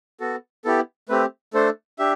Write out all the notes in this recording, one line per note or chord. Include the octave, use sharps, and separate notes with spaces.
B3 F#4 A4
B3 E4 G4 A4
A3 C4 G4 B4
A3 D4 A4 C5
D4 G4 E5